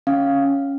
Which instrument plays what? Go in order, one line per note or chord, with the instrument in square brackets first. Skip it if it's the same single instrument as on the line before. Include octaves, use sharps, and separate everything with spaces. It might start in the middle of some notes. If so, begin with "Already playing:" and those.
[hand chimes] C#4 F5